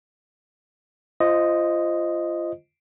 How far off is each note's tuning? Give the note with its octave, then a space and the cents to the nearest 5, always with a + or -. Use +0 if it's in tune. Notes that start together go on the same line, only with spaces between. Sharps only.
F4 -25 C5 +0 D#5 +0